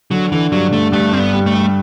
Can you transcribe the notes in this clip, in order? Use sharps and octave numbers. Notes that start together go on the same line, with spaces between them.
D3 F#3
D3 E3
G2 F#3
D3 A3
G2 A3
G2 C4
B3
G3
A3
G3